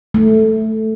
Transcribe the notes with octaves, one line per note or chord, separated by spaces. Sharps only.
A3